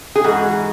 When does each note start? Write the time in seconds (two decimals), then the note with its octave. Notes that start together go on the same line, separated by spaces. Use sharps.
0.16 G#4
0.24 G#2 E3 F#4